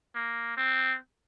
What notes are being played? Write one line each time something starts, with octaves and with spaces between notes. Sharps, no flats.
A#3
C4